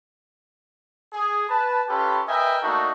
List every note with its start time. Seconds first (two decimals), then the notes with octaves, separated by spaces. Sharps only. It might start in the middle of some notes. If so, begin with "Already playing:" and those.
1.13 G#4
1.49 B4 A5
1.89 C#4 F4 G4 A4 B4
2.28 A#4 B4 D#5 E5 G5 G#5
2.62 A3 A#3 D4 D#4 F#4 A4